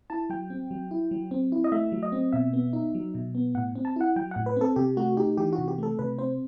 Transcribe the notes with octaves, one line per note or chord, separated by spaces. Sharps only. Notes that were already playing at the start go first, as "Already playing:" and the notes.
E4 A5
F#3 G5
C4
F#3
E4
F#3
C4
E4
D#5
A3 E5
F#3
D#5
C4
B2 E5
B3
D#4
F#3
B2
B3
A2 F#5
C4
A5
E4 F#5
F#3 G5
A2 F#5
B4
C4 A4
C3 G4
A3 F#4
D#4 G4
E3 G4
F#4
C3
G4
A3 A4
C3 B4
C4 C5